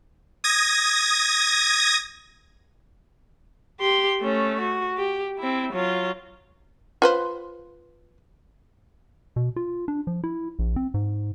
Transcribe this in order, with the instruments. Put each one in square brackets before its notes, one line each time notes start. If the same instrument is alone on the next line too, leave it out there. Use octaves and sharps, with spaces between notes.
[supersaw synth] D#6 G#6 A#6
[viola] G4 C6
A3 C#4
F#4
G4
C4 E4
F#3 F4
[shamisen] F4 B4 C5
[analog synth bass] B2
F4
D4
F3
E4
A#1
C4
G#2